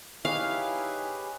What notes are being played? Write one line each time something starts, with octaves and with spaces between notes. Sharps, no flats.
D#4 E4 G4 G#4 B4 C#5 F5 G#5